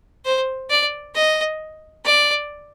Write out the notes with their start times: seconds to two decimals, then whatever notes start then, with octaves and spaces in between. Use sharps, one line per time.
0.25 C5
0.70 D5
1.15 D#5
2.05 D5